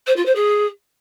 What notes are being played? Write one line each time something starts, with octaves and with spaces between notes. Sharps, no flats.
C5
F4
C5
G#4